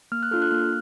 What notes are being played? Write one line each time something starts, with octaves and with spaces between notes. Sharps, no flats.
A#3 F6
F#6
D4 F4 A4 F6
F#6
A#3 F6